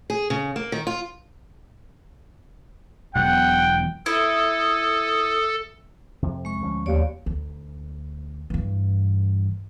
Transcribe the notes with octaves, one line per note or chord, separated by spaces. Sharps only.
G#4
C#3
A#3
D#3
F4
E1 B2 F#3 F#5 G5
E4 A4 D#6
F2 C3
G#3 C#6
D2 F3 C#4
D#2 C#5 D5
D2
G2 E3